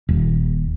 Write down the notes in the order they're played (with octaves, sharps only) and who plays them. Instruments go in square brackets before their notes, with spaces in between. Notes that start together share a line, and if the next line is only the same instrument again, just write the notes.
[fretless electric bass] D#1